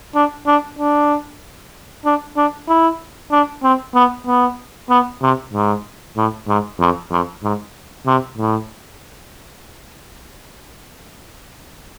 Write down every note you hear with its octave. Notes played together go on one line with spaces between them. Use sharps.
D4
D4
D4
D4
D4
E4
D4
C4
B3
B3
B3
C3
G#2
A2
G#2
F2
F2
G#2
C3
A2